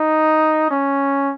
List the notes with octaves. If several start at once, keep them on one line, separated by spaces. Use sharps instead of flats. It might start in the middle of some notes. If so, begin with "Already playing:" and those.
Already playing: D#4
C#4